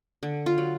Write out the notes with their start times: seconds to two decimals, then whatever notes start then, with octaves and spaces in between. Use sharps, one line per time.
0.23 D3
0.46 F4
0.58 F#3